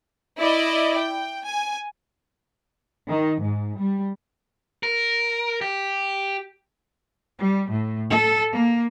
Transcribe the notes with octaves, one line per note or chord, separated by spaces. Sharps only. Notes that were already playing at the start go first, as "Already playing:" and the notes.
E4 D5 D#5
G5
G#5
D#3
G#2
G3
A#4
G4
G3
A2
A4
A#3